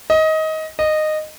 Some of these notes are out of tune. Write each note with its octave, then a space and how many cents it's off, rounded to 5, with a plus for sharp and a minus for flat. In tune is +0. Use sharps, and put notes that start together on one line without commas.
D#5 +20
D#5 -15